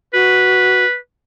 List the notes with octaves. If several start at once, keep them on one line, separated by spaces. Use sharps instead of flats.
F#4 B4